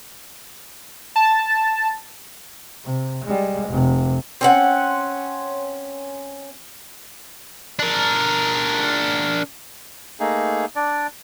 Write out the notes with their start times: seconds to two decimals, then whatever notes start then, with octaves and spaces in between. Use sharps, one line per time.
1.16 A5
2.84 C3
3.24 G3 G#3
3.69 F1 C3
4.41 C4 C#4 F#5
7.79 D4 A#4
10.20 A3 A#3 D#4 G#4
10.76 D4 D5